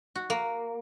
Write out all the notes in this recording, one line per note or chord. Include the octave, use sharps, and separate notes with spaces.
F#4
A#3